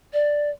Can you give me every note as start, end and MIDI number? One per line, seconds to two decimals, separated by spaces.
0.13 0.50 74